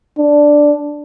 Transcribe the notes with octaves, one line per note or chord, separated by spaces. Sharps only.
D4